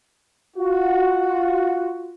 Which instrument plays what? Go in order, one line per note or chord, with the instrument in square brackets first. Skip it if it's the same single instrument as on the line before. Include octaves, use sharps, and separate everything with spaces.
[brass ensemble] F4 F#4